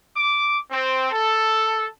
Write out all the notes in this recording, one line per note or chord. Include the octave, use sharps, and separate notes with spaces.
D6
C4
A4